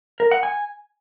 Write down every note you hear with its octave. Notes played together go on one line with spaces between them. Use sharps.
A#4
F#5
G#5